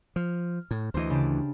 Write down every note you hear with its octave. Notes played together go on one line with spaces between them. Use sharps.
F3 F6
A2
D2 E3 C5 D#5
C#3 D4 G4